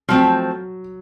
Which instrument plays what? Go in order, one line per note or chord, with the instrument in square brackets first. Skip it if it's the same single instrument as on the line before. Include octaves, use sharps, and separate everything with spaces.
[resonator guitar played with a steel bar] F3 A3 C4 [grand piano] F#3